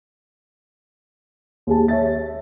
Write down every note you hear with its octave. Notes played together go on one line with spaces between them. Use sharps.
D#2 G#4 A5
C#5 E5 A6